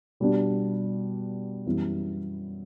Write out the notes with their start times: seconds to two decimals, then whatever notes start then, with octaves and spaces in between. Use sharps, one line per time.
0.20 B2 G3 B3 D4 F#4
1.66 F#2 E3 G3 B3 E4